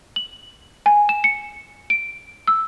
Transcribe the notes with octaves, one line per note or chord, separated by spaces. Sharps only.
F#7
G#5
E7
C#7
D7
E6